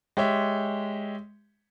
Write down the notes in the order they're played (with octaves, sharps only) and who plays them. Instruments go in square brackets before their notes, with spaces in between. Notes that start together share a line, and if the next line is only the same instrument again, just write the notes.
[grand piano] G#3 G4 C#5 E5